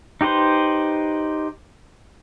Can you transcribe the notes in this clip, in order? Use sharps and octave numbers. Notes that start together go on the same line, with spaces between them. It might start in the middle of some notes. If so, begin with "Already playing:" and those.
D#4 G4 B4 C5